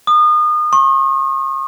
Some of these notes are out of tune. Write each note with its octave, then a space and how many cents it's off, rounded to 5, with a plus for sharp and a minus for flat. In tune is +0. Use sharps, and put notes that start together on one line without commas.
D#6 -30
C#6 -40